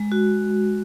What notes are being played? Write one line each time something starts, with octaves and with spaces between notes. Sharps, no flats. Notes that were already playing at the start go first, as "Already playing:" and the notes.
Already playing: G#3
F#4